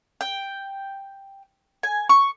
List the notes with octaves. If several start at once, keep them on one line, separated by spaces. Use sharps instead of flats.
G5
G#5
C#6